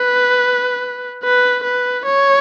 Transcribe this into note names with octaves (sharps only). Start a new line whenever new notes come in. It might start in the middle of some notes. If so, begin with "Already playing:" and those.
Already playing: B4
B4
B4
C#5